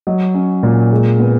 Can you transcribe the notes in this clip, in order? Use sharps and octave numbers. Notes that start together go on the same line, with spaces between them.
F#3 D#5
C#4
A#2
G#3
B3